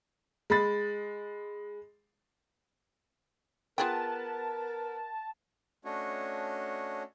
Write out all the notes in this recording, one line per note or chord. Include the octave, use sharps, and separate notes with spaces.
G#3 B5 A6
B3 F4 G#4 A#4 G5 A5
A3 C#4 D4 F#4 C#5 D#5